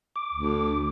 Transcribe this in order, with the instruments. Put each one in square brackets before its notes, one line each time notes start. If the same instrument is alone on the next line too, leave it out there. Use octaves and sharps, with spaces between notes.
[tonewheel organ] D6
[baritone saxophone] D2